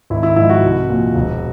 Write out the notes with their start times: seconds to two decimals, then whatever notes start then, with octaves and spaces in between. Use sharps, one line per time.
0.10 G#1 E4
0.23 E4
0.36 G#2 F3 E4
0.50 F#4
0.63 C2
0.89 A#2 F3
1.15 E1